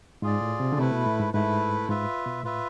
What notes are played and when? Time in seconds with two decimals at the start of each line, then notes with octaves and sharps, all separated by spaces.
0.22 G#2 F4 G#4 D5
0.41 A2
0.60 C3
0.73 D3
0.78 C3 A3 E4 B4
0.91 B2
1.06 A2
1.20 G#2
1.34 G#2 A3 E4 B4
1.89 G#2 F4 B4 E5
2.26 B2
2.44 A2 F4 B4 E5